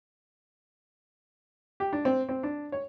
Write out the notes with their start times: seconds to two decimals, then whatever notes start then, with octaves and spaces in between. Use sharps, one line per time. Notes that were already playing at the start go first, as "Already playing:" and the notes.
1.80 G4
1.93 D4
2.05 C4
2.29 C4
2.43 D4
2.72 C#5